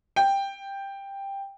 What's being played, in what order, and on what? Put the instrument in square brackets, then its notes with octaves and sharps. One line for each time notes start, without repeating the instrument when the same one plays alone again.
[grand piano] G5